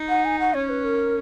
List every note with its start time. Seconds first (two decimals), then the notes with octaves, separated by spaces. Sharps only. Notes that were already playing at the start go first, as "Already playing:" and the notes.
Already playing: D#4
0.09 F#5
0.25 G#5
0.39 F#5
0.54 C#4 C#5
0.69 B4
0.84 A#4